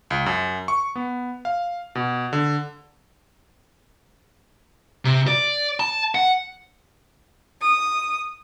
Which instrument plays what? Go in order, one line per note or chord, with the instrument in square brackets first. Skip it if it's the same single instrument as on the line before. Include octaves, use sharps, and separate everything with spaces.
[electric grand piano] C#2
F#2
C#6
B3
F5
B2
D3
[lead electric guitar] C3
D5
A5
F#5
[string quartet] D#6